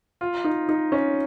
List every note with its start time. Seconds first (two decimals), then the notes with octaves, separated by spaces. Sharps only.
0.21 F4
0.45 D#4
0.69 D#4
0.92 C#4